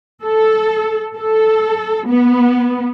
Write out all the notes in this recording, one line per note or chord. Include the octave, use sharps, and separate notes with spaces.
A4
A4
B3